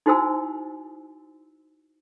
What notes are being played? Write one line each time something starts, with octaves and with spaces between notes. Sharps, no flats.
D#4 E4 F#4 C5 G#5 E6